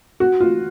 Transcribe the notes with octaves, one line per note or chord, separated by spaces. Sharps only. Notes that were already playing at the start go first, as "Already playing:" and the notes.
F#4
F4